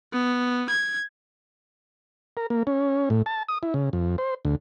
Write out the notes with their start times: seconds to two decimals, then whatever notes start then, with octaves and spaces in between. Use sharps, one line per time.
0.13 B3
0.69 G#6
2.37 A#4
2.50 A#3
2.67 C#4
3.10 A2
3.26 A5
3.48 D#6
3.63 E4
3.74 C#3
3.93 F2
4.18 C5
4.45 D2